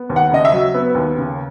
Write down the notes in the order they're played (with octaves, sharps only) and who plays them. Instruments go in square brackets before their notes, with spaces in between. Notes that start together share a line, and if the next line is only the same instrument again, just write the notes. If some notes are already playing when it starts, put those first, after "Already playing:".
Already playing: [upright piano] B3
D#2
F#5
C#3 D#5
E5
F#3
B3
D#2
C#3